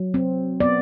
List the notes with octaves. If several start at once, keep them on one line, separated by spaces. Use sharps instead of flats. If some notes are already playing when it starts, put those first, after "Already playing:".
Already playing: F#3
C4
B3 D5